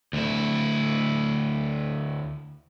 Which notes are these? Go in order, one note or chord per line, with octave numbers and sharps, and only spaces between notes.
D2 E4